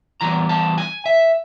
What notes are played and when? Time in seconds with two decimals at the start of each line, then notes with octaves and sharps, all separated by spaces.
0.21 E3 G3 B3 A#5
0.49 A5
0.78 G#5
1.06 E5